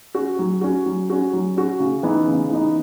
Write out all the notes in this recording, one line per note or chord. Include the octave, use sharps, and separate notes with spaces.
C#4 F#4
F#3
C#4 F#4
F#3
C#4 F#4
F#3
C#4 F#4
C#3
E3 B3 D#4
C#3
E3 B3 D#4